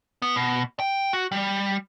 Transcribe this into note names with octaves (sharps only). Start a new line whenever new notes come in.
B3
B2
G5
F#4
G3